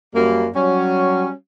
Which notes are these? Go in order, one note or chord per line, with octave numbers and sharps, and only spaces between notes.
F#2 G3 A#3
F#3 G3 C#4